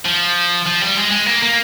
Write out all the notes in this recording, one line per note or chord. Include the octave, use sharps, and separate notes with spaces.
F3
F3
G3
G#3
G#3
A#3
A#3